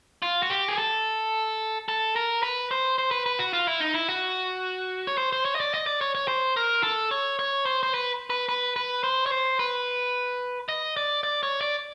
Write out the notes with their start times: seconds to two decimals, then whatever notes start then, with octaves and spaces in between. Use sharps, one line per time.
0.22 F4
0.43 F#4
0.50 G4
0.68 G#4
0.78 A4
1.88 A4
2.16 A#4
2.43 B4
2.71 C5
2.98 C5
3.11 B4
3.26 B4
3.39 F#4
3.53 F4
3.67 E4
3.80 D#4
3.94 E4
4.09 F#4
5.07 C#5
5.18 C5
5.33 C5
5.45 C#5
5.55 D#5
5.60 D5
5.74 D#5
5.86 D5
6.01 C#5
6.15 C#5
6.28 C5
6.56 A#4
6.83 A4
7.11 C#5
7.39 C#5
7.66 C5
7.83 C5
7.94 B4
8.30 B4
8.49 B4
8.76 B4
9.04 C5
9.26 C#5
9.32 C5
9.59 B4
10.69 D#5
10.97 D5
11.23 D5
11.43 C#5
11.61 D5